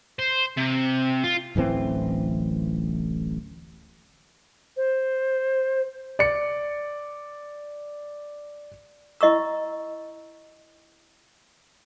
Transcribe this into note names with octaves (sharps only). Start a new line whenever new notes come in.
C5
C3
F4
D1 A1 E3 C4
C5
D5 C#7
E4 D#5 C#6 E6